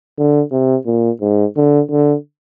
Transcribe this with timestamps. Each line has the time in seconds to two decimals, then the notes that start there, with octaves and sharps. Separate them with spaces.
0.18 D3
0.52 C3
0.86 A#2
1.21 G#2
1.56 D3
1.91 D3